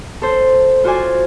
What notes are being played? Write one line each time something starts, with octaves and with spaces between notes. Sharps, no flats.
A4 C5
F4 F#4 C5 D5 G#5